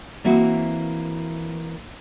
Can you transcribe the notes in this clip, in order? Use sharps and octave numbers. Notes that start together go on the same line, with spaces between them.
E3 A#3 C4 E4 F#4